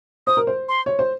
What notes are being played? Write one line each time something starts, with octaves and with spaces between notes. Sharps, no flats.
C5 D#6
A#4
C5
C6
C#5
C5